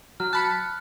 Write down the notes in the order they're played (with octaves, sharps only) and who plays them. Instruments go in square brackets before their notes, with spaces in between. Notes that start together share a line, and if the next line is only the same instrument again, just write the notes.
[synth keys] F#3 [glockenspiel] F6
[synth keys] A5 B5 C#7 [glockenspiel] F#6